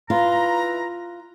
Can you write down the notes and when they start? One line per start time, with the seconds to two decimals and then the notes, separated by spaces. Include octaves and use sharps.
0.10 E4 F4 B4 A#5